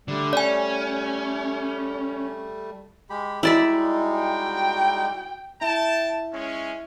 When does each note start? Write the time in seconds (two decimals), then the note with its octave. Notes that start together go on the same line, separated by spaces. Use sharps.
0.08 D3 G3 A3
0.33 C#4 D5 G#5
3.10 G#3 G4 B5
3.43 G3 G#3 D#4 E4 F#4 D5 E5
4.17 G5
5.61 E4 G5 A5
6.32 G#3 C#4